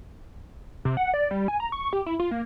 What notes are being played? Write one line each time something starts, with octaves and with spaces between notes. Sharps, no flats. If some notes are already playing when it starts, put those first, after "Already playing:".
C3
F#5
D5
G3
G#5
A#5
C#6
G4
E4
F4
A#3